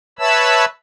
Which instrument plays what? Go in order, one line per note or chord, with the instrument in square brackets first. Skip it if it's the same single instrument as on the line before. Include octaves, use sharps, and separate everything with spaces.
[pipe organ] B4 C#5 E5 A5 B5 E6